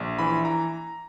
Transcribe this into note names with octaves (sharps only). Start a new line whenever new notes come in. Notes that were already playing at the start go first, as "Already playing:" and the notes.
Already playing: A#1
E3 B5
A#5